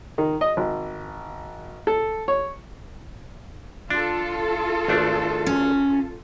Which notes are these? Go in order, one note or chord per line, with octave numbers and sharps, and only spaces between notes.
D#3
D#5
G#1
A4
C#5
D4 F4 A4
G#1 A3 D4
C#4